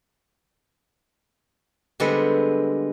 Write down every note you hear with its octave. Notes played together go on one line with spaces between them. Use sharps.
D3 G3 G#3 B3 C4